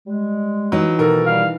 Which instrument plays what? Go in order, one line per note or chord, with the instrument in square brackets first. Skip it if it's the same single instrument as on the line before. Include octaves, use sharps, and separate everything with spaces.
[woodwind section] G3 G#3
[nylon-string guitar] E3 D#4 [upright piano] F#3
[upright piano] B2 D#3 A#4 [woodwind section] A#3 B3 A4
[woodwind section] G3 [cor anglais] F5